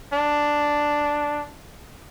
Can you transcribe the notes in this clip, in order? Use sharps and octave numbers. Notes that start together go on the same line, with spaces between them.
D4